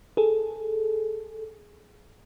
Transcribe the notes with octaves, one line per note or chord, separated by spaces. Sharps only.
G#4 A4